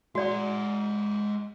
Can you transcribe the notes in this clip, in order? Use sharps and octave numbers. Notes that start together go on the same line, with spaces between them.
G#3 F#4 D5 F#5